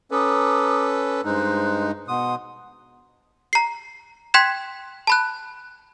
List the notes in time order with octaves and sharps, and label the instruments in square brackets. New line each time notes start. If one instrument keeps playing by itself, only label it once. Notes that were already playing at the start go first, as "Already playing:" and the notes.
[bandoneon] C#4 A4 B4 [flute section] A#5 D6 D#6
[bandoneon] G2 G#3 D#4 [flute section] C5 F#6
[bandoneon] B2 D#6 [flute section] F#5 C6
[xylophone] A#5 C7
G5 C6 F#6 G#6 B6 E7
A5 B5 F#6